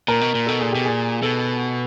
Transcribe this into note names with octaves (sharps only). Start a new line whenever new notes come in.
A#2 A#4
B2
A#2
B2 A4
A#2 G#4
B2 G4
A#2 G#4
B2 A4